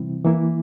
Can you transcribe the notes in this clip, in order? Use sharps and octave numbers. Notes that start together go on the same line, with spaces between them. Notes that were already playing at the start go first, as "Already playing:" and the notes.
Already playing: C3 E3 G3 C4 E4
E3 A#3 E4